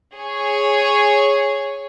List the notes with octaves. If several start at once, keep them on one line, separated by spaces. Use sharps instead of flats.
G#4 C#5